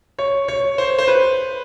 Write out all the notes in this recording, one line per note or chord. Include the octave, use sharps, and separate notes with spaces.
C#5
C#5
C5
C5
B4